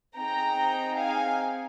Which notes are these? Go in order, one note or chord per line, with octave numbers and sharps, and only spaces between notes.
C4 D#4 G#4 G5 A#5
F5 G#5